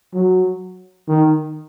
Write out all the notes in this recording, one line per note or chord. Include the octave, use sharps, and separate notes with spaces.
F#3
D#3